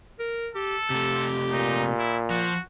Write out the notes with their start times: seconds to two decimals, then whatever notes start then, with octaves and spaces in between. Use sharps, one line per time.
0.19 A#4
0.55 G4 A4
0.90 C3 A3 G4
1.51 A#2 D#4
1.98 E4
2.30 F3 F#4